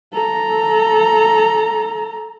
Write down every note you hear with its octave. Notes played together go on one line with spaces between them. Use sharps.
A4 A#5